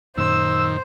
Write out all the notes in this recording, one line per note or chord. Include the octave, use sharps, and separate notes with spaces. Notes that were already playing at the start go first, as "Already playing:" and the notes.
F#2 A#2 D#3 C5 E6